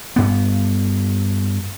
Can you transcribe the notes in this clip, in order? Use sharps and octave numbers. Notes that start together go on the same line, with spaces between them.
G2 B3